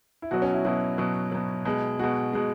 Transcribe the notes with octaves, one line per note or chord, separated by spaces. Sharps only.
E4
B2 F#3 F#4
C#4
E4
B2 F#3 E4
B2 F#3
B2 F#3
B2 G#3
B2 G#3 F#4
B2 G#3